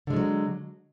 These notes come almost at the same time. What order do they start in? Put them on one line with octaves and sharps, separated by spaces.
D3 G#3 F3 F#3